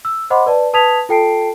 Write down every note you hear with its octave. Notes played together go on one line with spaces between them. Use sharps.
E6
C5 D#5 F#5 B5 C6 D6
B4 D5 A5
B4 A5 D#6 G#6 B6 F7
F4 A4 G5 A5 C7 D7